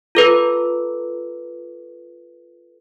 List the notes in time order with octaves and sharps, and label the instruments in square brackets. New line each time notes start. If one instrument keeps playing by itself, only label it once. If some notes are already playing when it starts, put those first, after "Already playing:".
[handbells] F4 A4 B4